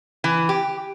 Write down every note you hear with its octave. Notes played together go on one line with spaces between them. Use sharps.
E3
G4